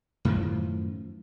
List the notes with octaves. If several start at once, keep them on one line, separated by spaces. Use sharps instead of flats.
F#2 A2 D#3 F3